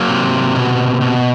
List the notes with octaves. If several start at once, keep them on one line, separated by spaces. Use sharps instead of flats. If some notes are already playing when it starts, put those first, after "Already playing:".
Already playing: F#3 A#3
C3
B2
B2